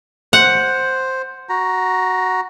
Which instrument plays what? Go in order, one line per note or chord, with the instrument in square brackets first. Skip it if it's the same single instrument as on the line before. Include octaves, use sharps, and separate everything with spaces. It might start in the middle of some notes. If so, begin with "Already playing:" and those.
[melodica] C5 [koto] F#5
[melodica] F#4 A#5